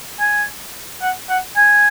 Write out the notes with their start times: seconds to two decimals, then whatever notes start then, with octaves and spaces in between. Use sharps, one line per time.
0.20 G#5
1.01 F#5
1.29 F#5
1.56 G#5